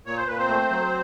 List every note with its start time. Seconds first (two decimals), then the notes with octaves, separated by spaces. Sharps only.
0.06 A#2 C#5
0.17 C5
0.27 A#2 B4
0.38 C4 C5
0.49 A3
0.71 F#3